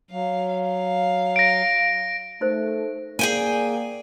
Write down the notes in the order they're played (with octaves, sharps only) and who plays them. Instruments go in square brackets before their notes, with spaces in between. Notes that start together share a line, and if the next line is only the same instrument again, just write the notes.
[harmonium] F#3 [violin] F5
[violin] F5
[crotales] A#6 D7
[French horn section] A3 [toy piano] D#4 A#4 C5
[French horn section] A#3 D5 [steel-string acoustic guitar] G#4 G5 G#5